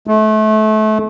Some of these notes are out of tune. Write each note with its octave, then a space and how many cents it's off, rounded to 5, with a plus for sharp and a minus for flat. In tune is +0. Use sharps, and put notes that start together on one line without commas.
A3 -30